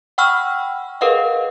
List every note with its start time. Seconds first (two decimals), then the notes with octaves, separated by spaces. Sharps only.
0.18 F#5 G5 B5 C#6 E6 F6
1.01 G#4 A#4 B4 D#5 F5 F#5